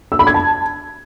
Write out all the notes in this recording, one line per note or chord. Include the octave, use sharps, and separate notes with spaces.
E6
B5
G#6
A5